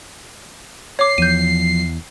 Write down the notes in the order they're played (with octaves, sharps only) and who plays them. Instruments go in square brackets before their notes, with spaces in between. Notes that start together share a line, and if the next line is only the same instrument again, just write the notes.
[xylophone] C#5 D6 [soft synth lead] C7
[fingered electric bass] E2 [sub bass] F3 [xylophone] G6 D#7